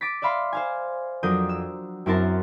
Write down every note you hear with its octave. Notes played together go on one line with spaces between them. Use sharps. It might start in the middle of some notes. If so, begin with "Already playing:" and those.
D6 A6 B6
D5 E5 F5 B5 C6
C5 F5 G#5
F2 F#3 D4 A#4 D#6 G6
E6
F#2 C4 E4 A#4 A5 C6